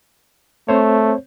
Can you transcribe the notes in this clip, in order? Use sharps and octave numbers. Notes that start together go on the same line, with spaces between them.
A3 C4 C5 C#5